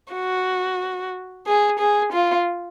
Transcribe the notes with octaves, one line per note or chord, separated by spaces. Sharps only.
F#4
G#4
G#4
F4